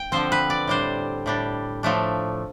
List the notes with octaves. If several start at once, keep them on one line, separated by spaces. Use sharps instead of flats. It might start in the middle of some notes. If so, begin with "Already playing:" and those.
Already playing: G5
D3 F3 C4 C5
B4
D5
A2 G3 D4 C5
A2 G3 D4
A2 F3 A3 D4